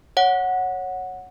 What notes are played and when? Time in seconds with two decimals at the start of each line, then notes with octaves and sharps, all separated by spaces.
0.17 C#5 F#5